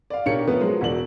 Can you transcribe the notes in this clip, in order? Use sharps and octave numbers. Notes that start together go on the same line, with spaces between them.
D5 F5
B1 D4 G4 A#4 C#5 C#7
F3 A3 B3 C#4 A#4 B4
F3 F#3 G#3
E1 F#4 D5 F#7